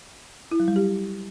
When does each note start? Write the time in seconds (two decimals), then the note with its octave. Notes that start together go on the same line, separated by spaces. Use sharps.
0.51 E4
0.60 F#3
0.68 G3
0.76 G4